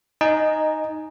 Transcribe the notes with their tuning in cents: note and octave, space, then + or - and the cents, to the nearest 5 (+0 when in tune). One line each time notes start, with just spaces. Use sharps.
D#4 +0 D#5 -15 G#5 +10